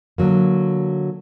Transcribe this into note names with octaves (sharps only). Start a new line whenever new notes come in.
D3 F#3 A#3